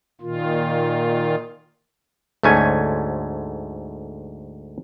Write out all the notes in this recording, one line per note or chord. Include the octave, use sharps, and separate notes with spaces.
A#2 D#3 F4
D2 G#2 A3 C#4 G#5